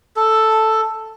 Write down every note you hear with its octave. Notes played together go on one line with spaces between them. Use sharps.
A4